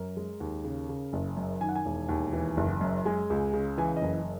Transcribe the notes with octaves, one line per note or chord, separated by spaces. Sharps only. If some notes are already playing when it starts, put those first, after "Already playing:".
Already playing: F#2 A#4
G#3
D#2
C#3
C#3
F#1
F#2
D#3 G#5
F#5
G#5
E1
D#2
E3
F#1
F#2
G#3 G#5
C#2
C#3
E3 G#5
D#5
F#1
D#5